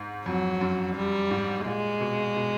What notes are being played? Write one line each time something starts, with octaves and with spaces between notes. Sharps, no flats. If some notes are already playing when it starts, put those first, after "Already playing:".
Already playing: G#2
F2 F#3
F#2
G3
G#2
A#2 G#3
B2
B2